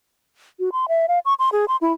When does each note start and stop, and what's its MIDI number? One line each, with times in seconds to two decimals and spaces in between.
0.60 0.69 66
0.72 0.86 84
0.89 1.06 76
1.08 1.19 77
1.25 1.34 85
1.39 1.49 84
1.52 1.65 68
1.68 1.76 84
1.81 1.93 64